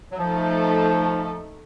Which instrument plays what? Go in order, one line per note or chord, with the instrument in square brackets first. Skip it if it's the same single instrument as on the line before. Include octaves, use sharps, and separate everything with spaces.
[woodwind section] F#3
[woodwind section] F3 [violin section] A3 D#4 A4